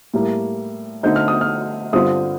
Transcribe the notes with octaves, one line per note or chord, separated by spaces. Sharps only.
A2 G3 A#3
D3 A3 C4 D#4 G6
F6
D#6
F6
G2 D3 G3 C4 F4 D#6